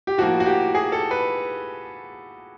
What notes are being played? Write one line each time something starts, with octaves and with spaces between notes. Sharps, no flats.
G4
A2 F3 A#3 F#4
F#4
G4
G#4
A4
B4